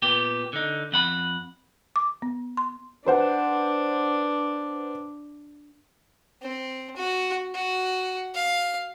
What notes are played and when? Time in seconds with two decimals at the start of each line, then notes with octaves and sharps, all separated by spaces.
0.02 A#2 B3 G4
0.53 D3 D#4
0.92 F2 F#5 B5
1.96 D6
2.22 B3
2.57 C6
3.06 D4 B4 C5 F#5
6.42 C4
6.97 F#4
7.55 F#4
8.34 F5